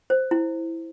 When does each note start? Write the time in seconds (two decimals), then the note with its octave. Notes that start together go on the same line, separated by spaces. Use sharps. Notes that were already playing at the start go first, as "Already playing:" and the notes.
0.10 C5
0.31 E4